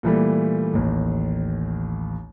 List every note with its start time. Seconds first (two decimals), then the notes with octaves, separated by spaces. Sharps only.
0.03 A#2 E3 G3 A3
0.74 A1 D#2